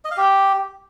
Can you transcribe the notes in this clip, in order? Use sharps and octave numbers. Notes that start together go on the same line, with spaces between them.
D#5
F5
G4